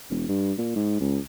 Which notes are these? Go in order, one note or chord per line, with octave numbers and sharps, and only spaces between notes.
E1
G2
A#2
G#2
C#2